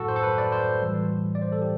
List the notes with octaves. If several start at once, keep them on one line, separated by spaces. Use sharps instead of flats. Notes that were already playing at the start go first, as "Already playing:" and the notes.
Already playing: A2 F#3 F#4 A4
C5
A4
B4
D5
C5
A2 E3 G3
D5
C5
A4
G4